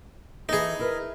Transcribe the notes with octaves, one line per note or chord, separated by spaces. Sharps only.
E3 D#4 G#4 A4
E4 A#4 B4